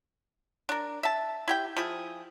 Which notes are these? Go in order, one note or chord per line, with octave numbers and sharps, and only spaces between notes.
D4 A#4
E5 A5
E4 G4 G5
F3 E4 G#4